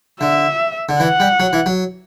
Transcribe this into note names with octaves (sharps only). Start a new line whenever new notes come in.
D3 E5
D3
E3 F#5
G3
F#3
E3
F#3